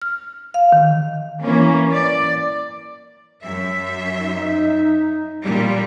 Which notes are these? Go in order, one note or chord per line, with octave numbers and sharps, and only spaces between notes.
F6
F5
D#3
E3 A#3 C#4
D5
F#2 E5
D#4
A#2 G3